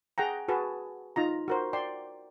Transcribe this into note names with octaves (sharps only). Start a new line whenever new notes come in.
G#4 F#5 G5 A#5
F#4 G#4 B4 A5
D#4 F4 A#5
F#4 A#4 C5
D5 G5 C6